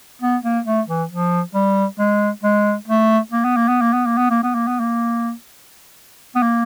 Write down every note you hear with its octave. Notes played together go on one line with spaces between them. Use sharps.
B3
A#3
A3
E3
F3
G3
G#3
G#3
A3
A#3
B3
A#3
B3
A#3
B3
A#3
B3
A#3
B3
A#3
B3
A#3
B3
A#3